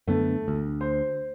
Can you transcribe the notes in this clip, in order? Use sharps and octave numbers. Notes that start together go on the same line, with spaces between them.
F#2 D3 A3 B3
D2
C5